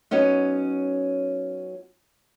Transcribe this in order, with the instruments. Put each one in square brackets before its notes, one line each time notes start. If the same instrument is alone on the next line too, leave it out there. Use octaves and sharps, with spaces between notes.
[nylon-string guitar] F#3 B3 C#4 D#4